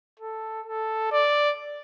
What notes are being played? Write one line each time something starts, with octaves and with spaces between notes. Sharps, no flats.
A4
A4
D5